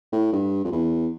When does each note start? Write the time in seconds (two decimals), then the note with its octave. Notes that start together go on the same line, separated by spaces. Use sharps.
0.13 A2
0.33 G2
0.65 F2
0.72 E2